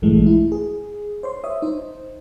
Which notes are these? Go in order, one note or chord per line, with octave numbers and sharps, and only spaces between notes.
A#1 G2 E3 G#3 A3
E4
G#4
C5 C#5 C6
C#5 E5 D#6
D#4 C5